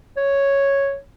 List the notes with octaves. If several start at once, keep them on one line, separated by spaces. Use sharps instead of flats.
C#5